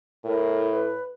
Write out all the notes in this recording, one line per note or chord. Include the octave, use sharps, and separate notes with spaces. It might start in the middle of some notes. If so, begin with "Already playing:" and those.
A2 A#4
B4